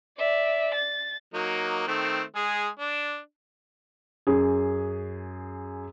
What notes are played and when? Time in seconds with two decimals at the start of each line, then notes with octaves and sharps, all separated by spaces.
0.18 D5 E5
0.74 A6
1.34 F#3 A#3 D#4
1.87 D#3 A3 C4
2.36 G#3 G#4
2.80 D4
4.27 F#2 G#4